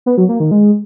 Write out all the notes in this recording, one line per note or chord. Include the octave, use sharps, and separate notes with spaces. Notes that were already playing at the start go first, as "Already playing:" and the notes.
B3
F#3
A#3
D#3
G#3